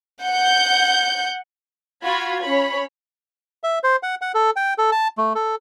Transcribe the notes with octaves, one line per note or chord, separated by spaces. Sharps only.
F#5 G6
F4 F#4 B5 G#6
C#4 C#5 B5
E5
C5
F#5
F#5
A4
G5
A4
A5
A3
A4